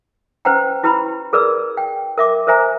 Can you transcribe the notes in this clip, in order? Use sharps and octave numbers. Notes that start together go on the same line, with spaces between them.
C#4 B4 C5 F#5 G5 A#5
E4 G4 B4 A#5 B5
G#4 A#4 B4 D5 E6
G5
A#4 E5 D6
A#4 C5 E5 G#5 A#5